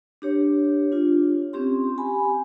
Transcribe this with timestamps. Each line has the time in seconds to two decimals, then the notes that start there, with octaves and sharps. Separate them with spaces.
0.22 D4 G4 C#5
0.92 D4 F4
1.53 C4 C#4 G4 C6
1.98 G4 G#5 B5